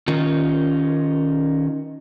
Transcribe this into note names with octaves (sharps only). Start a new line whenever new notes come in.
D#3 C#4 D#4 F4